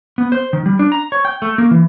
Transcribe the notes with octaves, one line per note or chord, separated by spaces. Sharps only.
B3
C5
D#3
G3
D4
A#5
C#5
G5
A3
A#3
E3